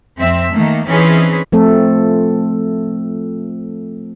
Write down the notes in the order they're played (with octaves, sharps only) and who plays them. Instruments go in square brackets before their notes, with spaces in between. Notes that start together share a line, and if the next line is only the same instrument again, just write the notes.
[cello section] F2 C4 E5
D#3 A3 A#3
E3 C4 C#4 D#4 G#4 B4
[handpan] F3 A3 C4 A4